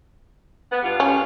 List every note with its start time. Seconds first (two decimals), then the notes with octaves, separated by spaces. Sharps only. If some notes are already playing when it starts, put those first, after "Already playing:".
0.71 B3
0.83 G2 G3 F4
1.00 C#4